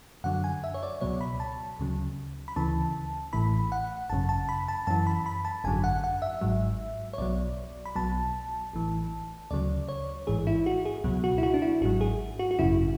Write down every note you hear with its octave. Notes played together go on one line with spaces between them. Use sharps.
F#2 D3 F#3 F#5
G#5
E5
C#5
D5
C#2 B2 F#3 C#5
B5
A5
D2 C#3 F#3
B5
D2 C#3 E3 A5
A1 A2 E3 B5
F#5
G#1 F#2 C#3 A5
A5
B5
A5
F#2 E3 A5
B5
B5
A5
G#1 F#2 D3 F#3 G#5
F#5
F#5
E5
G#1 G#2 F#3
C#5
B1 B2 F#3 D5
B5
B1 B2 F#3 A5
A1 A2 E3
D2 C#3 F#3 D5
C#5
A1 G#2 E3 G#4
E4
F#4
G#4
C#2 B2 F#3
F#4
E4
F#4
D4
E4
G#1 G#2 F#3 F#4
G#4
F#4
F#4
G#1 F#2 C#3 E4